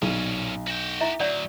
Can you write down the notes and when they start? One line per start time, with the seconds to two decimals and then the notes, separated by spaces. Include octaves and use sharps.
0.02 B1 A#2 C#4
0.68 F#4 G5
1.01 E4 E5
1.20 D2 F#3 C#5 D5 F#5